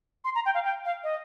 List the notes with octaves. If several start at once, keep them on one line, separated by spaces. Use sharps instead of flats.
C6
A#5
G5
F5
G5
F5
D#5